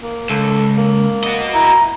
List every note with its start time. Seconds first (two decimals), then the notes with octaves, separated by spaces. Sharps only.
0.02 A#3
0.30 C#2 A4
0.77 A#3
1.24 F#4 D#5
1.54 E4 A#5